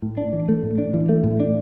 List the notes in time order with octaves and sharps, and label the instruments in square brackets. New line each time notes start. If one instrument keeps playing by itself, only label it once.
[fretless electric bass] A2
D4
E3
A3
A2
D4
E3
A3
A2
D4